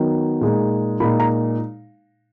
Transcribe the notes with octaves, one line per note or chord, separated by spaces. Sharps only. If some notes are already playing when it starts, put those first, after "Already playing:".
Already playing: D#3 F#3 B3 D#4
A#2 G#3 D#4
A#2 G#3 D#4 B5
A#5